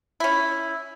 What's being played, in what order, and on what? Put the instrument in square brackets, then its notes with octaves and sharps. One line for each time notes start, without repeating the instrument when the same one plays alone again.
[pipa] C#4 E4